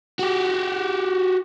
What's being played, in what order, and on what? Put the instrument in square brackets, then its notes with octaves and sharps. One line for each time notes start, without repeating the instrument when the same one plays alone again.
[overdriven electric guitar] F#4 G4